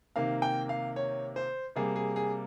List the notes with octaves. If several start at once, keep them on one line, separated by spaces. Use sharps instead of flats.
C3 D#3 A#3 F5
G5
F5
C#5
C5
C3 G3 A#3 G#4
G#4
G#4